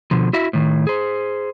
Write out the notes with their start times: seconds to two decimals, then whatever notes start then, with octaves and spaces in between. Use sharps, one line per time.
0.11 B2 D3 F3
0.33 E4 F#4 E5
0.53 A2 D#3
0.87 G#4 C5